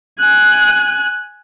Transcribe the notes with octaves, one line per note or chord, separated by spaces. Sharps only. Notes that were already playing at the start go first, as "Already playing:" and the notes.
G#5 F#6